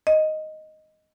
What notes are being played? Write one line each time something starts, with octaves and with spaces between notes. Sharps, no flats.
D#5